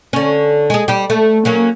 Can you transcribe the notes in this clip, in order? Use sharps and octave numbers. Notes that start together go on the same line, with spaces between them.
D3 C#4
G#3 G#4
G3 G4
A3
F#3 A#3 C#4